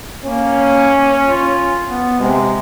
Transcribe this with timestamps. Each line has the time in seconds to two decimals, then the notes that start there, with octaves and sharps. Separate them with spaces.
0.24 A#3 C#4
1.27 F4
1.87 B3
2.20 C3 G#3